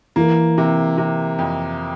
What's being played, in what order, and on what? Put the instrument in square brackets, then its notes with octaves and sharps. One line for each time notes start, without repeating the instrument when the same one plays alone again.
[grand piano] E3 [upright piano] A#3
[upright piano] C3
C3
F2